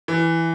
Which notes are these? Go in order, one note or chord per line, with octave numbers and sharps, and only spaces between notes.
E3